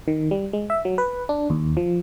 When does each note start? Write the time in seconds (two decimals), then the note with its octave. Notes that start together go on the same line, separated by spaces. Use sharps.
0.08 D#3
0.31 G3
0.53 G#3
0.70 E5
0.85 F#3
0.98 B4
1.29 D4
1.50 D#2
1.77 F3